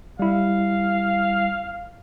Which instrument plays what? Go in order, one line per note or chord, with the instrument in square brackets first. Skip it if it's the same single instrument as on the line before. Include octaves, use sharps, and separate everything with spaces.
[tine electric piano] G3 E4 [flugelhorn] F5